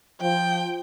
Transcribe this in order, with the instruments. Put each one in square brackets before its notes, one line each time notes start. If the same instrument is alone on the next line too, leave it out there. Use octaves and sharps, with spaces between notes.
[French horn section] F3 [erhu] G5